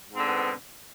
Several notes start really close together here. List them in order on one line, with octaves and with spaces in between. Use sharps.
G#2 C4 D3 B2 B3